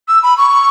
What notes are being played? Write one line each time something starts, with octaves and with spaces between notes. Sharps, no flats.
E6
B5
C#6